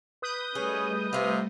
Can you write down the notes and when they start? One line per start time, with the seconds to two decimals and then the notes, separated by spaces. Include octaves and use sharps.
0.22 B4 D#6 G6
0.55 G3 A3 C#4 G#4 D#5
1.13 C3 F4 G#4 A#4